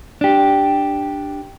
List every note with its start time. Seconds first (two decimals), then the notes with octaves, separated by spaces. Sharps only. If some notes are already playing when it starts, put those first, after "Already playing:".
0.21 D4 G4